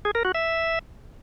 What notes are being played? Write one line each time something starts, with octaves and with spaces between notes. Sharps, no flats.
G#4
A#4
F#4
E5